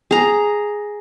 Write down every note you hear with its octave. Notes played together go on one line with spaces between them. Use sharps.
G#4 A#5